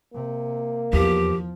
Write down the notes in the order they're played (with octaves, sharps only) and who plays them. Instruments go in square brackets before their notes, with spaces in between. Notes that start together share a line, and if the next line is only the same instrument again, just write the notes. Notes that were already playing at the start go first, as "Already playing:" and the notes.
[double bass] C3 [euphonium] A#3
[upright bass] E2 [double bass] F3 [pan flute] G4